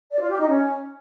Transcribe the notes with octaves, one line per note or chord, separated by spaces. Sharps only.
D5
F4
G4
D#4
C#4